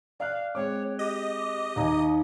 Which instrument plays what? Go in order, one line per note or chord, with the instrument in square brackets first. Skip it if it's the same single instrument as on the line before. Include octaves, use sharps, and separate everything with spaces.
[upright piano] D5 F6 F#6 [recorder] F5
[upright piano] G#3 C4 D6 [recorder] C#5
[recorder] G4 [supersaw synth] D#5
[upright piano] D#2 D#6 [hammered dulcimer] D#4 E4